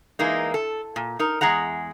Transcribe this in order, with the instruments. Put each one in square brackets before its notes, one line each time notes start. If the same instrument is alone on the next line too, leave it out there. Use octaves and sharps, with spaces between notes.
[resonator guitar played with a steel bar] E3 G#3 A#3 D#4
A4
A#2
D#4 A#4
E2 G#3 G#4 F#5 A#5